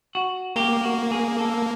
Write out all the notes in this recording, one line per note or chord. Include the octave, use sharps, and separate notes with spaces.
F#4
A#3 G4
F#4
G#4
A4